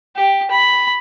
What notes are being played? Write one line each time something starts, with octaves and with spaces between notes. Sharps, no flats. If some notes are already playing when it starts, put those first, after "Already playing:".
G4
B5